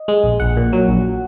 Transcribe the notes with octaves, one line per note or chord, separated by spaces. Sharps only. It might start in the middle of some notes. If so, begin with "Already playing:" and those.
Already playing: D#5
G#3
A#1
A#1 F#5
A#2
F#3
A#1